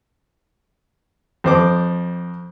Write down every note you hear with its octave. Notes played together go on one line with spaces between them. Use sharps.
F2 C5 D6